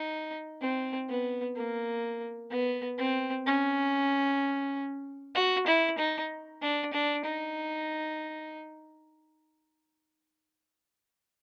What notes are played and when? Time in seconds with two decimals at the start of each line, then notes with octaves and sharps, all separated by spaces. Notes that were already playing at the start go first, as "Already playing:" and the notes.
Already playing: D#4
0.62 C4
1.10 B3
1.56 A#3
2.51 B3
2.98 C4
3.47 C#4
5.35 F#4
5.67 E4
5.98 D#4
6.62 D4
6.93 D4
7.25 D#4